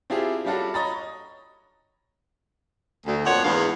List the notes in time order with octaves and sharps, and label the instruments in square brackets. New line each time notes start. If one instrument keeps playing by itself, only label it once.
[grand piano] C4 D4 E4 F4 G4 G#4
G3 C#4 D4 F4 F#4 A4
C#5 D#5 A#5 B5 A6
[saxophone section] D2
F2 A#2 C#5 F#5
E2 G#2 E3 D4 F5